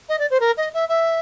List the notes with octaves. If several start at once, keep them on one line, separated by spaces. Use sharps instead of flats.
D#5
D5
C5
A#4
D#5
E5
E5